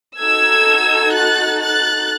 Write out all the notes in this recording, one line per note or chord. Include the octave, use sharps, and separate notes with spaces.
D#4 F#4 A4 E6 G#6
F#6 A6
F#6 A6